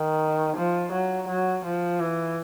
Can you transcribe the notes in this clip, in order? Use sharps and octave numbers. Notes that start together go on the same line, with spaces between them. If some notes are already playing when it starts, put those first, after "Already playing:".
Already playing: D#3
F3
F#3
F#3
F3
E3